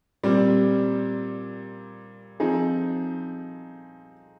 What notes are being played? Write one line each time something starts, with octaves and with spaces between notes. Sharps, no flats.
A#2 G3 C4
F3 C4 D#4 G#4